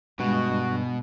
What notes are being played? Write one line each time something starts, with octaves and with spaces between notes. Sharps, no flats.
G2 B2 G#3 F#4